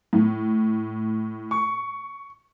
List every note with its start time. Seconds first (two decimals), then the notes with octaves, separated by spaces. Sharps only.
0.13 A2
1.51 C#6